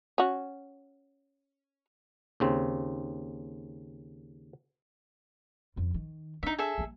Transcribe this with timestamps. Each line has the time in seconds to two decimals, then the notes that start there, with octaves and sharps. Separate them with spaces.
0.18 C#4 F#4
2.40 D#2 C#3 C4
5.76 F2 C#3
5.94 D#3
6.43 D4 D#4 E5
6.58 G#4 A4 E5
6.78 G3 A#3